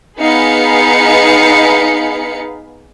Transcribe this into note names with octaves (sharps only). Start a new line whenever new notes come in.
B3 D#4 G#4 F5 B5 C#7